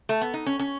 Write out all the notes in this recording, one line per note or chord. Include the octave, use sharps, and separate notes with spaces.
A3
B3
D#4
C#4
C#4